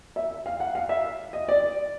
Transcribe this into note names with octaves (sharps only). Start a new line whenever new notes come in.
E5
F5
F#5
F5
E5
D#5
D5